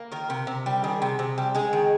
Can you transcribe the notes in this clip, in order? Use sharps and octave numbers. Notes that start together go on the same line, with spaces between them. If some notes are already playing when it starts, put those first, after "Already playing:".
Already playing: A#3
D#3 A#4
C3
C3
G3
D#3 G#4
C3
C3
G3
G#3 G#4
D#3